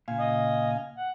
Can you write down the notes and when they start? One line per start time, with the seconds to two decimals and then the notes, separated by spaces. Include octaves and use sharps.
0.08 A#2 C#3 F5 G#5
0.19 D#5
0.97 F#5